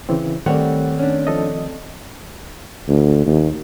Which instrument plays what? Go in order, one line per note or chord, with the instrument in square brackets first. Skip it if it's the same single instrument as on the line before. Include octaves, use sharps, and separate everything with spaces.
[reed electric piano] C#3 E3 C4
[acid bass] D#3 [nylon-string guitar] G3 C#5 [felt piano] A3 C4 D5 [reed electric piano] F#5 F#6
[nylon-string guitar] C#4 D4
[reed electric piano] F3 A4 D#5
[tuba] D2
D#2